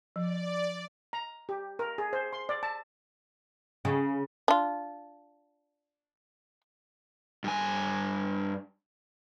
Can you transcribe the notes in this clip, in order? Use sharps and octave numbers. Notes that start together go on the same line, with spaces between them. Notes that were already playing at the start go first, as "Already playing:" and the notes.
F3 D5
A#5
G4
A#4
G#4
C5
C6
D5
A5
C#3
D4 F4
G2 G#5